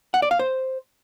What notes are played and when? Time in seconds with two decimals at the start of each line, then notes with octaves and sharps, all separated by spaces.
0.14 F#5
0.22 D5
0.31 F5
0.39 C5